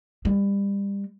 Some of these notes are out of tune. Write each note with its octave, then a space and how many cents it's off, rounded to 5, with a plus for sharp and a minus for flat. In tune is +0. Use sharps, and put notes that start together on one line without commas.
G3 +25